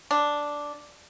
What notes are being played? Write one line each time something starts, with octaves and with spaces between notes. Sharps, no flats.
D4